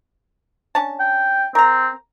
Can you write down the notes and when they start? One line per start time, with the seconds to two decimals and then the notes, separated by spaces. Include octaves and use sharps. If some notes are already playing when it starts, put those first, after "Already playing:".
0.75 C#4 D4 A5
1.00 G5
1.55 C4 A#4 A#5